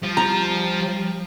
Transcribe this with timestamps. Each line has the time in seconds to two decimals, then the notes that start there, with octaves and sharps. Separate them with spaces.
0.03 F3 G3
0.17 A#5